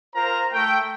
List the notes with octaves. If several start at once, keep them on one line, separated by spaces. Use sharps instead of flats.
F4 A#4 C5 A#5
A3 G5